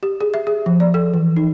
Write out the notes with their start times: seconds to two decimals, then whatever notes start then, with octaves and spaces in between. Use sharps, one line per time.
0.03 G4
0.20 G#4
0.34 E5
0.47 G#4
0.66 F3
0.80 D5
0.94 A4
1.14 E3
1.36 D#4